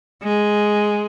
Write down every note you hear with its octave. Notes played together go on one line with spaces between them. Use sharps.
G#3